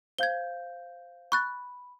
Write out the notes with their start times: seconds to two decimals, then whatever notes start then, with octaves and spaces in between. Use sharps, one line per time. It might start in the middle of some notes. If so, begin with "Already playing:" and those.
0.18 C5 F5 G6 G#6 G7
1.32 B5 C#6 F#6 A6